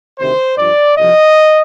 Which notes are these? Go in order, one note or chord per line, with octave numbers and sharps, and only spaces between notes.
D2 C3 D#3 C5
G2 F3 D5
C2 C3 F3 D#5